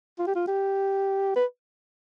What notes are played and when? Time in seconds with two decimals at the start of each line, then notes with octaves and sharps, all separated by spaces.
0.19 F4
0.27 G4
0.35 F4
0.47 G4
1.35 B4